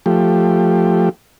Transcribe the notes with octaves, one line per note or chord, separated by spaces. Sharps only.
F3 A3 G4